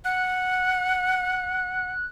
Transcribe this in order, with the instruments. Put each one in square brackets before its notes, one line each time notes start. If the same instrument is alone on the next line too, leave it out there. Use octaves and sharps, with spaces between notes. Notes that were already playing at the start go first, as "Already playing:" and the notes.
[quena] F#5 [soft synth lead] F#6